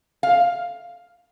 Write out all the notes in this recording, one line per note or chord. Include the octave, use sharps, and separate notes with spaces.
F5